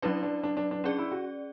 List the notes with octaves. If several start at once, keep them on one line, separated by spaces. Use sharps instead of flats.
F#3 C#4 D4 E4 B4 D5
D4
D4
D4
D4
C#4 D4 G#4 D5
E4
F#4